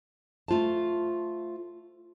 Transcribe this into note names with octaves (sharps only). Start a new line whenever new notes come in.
A3 F4 C5 A5